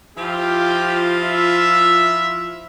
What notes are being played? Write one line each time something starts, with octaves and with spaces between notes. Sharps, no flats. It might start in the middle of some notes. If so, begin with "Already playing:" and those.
F3 E4 F4 G4
E5